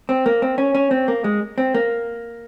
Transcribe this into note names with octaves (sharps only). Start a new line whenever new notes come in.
C4
A#3
C4
C#4
C#4
C4
A#3
G#3
C4
A#3